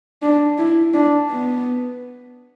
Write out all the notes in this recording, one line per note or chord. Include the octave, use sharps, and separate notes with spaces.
D4
E4
D4
B3